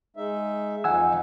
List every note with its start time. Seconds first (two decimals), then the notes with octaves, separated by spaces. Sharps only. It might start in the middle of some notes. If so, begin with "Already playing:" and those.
0.16 G#3 D#4 E5
0.84 F2 F3 D#4 F#5 G#5 E6